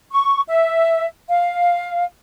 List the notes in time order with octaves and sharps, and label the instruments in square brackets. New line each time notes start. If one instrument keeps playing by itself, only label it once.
[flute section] C#6
E5
F5